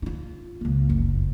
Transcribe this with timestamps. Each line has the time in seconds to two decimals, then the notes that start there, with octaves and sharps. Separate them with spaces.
0.02 D#4 F4
0.61 C#2 A#3
0.89 F#1 F2